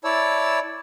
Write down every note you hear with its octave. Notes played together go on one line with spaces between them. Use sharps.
E4 C#5 D5 A5 E6